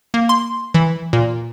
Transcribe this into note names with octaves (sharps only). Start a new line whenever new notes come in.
A#3
C6
E3
A#2